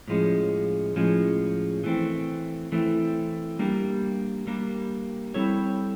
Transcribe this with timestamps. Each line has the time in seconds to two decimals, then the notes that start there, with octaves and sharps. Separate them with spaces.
0.08 A2 F3 G#3 C#4
0.96 A2 F3 G#3 C#4
1.84 E3 A3 C4
2.72 E3 A3 C4
3.59 G3 A#3 D4
4.47 G3 A#3 D4
5.34 G3 C4 E4 A4 C#5